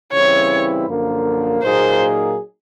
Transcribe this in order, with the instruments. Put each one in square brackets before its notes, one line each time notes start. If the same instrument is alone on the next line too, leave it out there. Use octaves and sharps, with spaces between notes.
[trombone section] C#3 E3 G3 C4 E4 [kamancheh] C#5
[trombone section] F#2 D3 F3 A#3
[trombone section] A#2 F#3 A#3 D#4 G#4 [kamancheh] C5